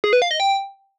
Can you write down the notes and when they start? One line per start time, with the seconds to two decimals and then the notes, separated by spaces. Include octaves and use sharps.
0.04 G#4
0.13 B4
0.22 F5
0.31 D#5
0.40 G5